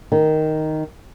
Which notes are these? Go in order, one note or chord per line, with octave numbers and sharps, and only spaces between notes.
D#3